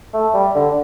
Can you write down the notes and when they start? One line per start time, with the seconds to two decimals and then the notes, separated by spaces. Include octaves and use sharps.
0.14 A3
0.34 G3
0.55 D3